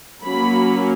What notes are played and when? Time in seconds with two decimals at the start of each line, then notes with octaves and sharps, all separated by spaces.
0.24 F#3 A#3 C#4 B5